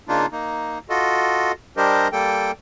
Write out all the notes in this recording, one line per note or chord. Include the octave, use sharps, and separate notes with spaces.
C#3 A#3 D4 D#4 F4
A#3 D#4
F4 F#4 A4 D#5
G3 D4 G4 A#4 C5 D#5
G3 A#3 A4 G5